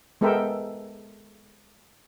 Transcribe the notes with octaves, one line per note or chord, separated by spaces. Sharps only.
G#3 B3 A4 A#4 E5 G5